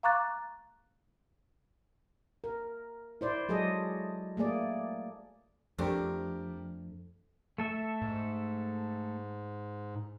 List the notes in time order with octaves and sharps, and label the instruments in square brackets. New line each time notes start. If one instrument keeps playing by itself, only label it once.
[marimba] F5 A#5 C#6 D6 F#6 A6
[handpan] A#4
E4 C5 D5
F#3 G#3 G#4 A4 D#5
A3 A#3 G#4 D5
[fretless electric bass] F2 [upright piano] G3 G4 A#4 [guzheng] A3 C4 D4
[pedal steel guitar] A3 A4 E5
[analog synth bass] G#2